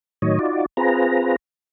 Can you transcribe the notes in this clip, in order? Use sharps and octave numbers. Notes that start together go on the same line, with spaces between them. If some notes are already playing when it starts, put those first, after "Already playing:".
A2 D#3 F#3 C#5 D#5
D#4 F4 F#4 D5
C4 F4 G#4 B4 A#5